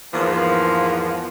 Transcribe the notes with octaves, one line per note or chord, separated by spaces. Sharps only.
E2 G#2 F3 A#3 B3